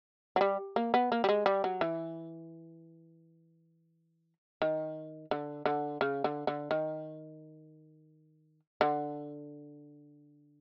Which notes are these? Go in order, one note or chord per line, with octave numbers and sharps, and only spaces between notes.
F#3
G3
A#3
B3
A#3
G3
G#3
G3
F#3
E3
D#3
D3
D3
C#3
D3
D3
D#3
D3